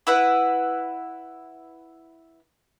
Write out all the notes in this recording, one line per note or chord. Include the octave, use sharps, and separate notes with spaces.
E4 B4 F#5